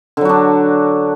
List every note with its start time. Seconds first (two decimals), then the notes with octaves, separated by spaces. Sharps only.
0.17 D3
0.21 F#3
0.25 F#4
0.29 D4